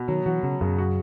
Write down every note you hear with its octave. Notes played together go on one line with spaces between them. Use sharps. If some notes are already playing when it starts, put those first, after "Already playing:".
Already playing: B2
D#3 F#3
E3 F#4
C#3 F#3
F#2 C#3
F#4